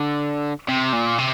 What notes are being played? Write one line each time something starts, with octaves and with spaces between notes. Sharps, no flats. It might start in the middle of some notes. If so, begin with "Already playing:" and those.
Already playing: D3
C3
A#2
C3